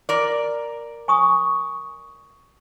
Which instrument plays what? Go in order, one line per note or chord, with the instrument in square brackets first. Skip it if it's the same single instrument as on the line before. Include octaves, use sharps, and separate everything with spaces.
[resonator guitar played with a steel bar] A#4 D5
[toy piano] G#5 C#6 D#6